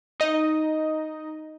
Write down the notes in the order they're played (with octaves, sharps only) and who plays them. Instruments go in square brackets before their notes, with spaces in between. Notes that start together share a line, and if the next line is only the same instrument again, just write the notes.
[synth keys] D#4 D#5